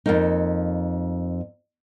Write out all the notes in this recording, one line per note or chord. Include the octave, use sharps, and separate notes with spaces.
F2 A#3 D#4